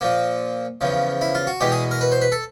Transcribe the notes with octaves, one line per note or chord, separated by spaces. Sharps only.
A#2 F3 A#3
E2 C#3 F3
E4
F4
F#4
E2 B2 G#3 G4
G#4
A#4
B4
C5
B4
A4